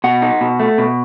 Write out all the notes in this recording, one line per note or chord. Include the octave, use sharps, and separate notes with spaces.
B2 F#5
D#4
B2
A3
B2